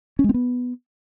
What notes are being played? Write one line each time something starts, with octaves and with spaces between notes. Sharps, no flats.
C#4
G#3
C4
B3